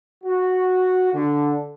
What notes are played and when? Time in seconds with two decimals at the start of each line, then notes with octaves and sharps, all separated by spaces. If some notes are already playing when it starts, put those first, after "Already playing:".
0.24 F#4
1.13 D3